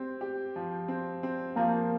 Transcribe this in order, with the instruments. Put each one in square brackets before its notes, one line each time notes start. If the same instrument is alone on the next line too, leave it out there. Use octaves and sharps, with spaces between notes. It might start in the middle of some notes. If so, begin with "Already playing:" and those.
Already playing: [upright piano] C4 G4
G4
F3
C4
C4
[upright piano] F3 [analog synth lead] A#3